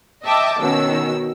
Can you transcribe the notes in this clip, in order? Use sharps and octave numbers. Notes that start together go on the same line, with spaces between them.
D#5 E5 G5 A5 D6
B2 D#3 C#4 E6